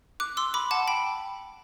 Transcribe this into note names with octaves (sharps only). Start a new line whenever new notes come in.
D6 F#6
C6 E6
B5 D6
F#5 A5
G5 B5